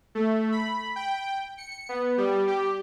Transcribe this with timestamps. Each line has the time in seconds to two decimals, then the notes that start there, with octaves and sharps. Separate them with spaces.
0.15 A3
0.52 B5
0.96 G5
1.58 C#7
1.89 B3
2.18 G3
2.47 G4